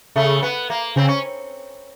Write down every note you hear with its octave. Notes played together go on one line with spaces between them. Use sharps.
C#3 A3
B3
A#3
C#3 C4
C#4